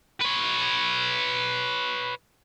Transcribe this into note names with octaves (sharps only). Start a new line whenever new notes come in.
B4 C#5